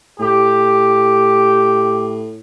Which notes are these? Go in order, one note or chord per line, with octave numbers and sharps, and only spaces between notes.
A2 G4